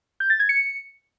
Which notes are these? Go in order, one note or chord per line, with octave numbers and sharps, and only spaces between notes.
G6
A6
G#6
C#7